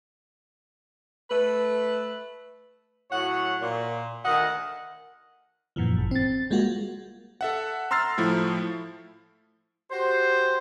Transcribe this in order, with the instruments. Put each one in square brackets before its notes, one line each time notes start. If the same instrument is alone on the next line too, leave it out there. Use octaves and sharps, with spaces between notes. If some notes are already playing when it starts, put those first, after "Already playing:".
[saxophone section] A3 B4
A2 F#3 F#4 C#5 F#5
A#2
D2 D#3 D#5 F#5
[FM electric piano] F#2 A#2 E3 F3
G#1
C4 A6
G3 G#3 A#3 F4 F#4
[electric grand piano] A4 E5 F#5
A#5 C6 E6 F6 A6 C7
A2 F3 A3 E4
[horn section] F#4 G4 C5